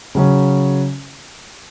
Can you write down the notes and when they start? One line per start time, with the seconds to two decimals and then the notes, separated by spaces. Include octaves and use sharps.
0.15 C#3 F#3 C#4